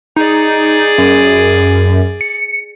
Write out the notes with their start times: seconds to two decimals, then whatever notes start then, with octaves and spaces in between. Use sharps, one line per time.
0.16 D#4 G#4 D5
0.98 F#2
2.21 C#7